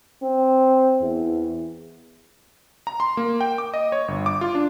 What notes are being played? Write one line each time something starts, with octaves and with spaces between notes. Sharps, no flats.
C4
E2
A#5
C6
A#3
G5
D6
D#5
C#5
G1
D6
F4
D4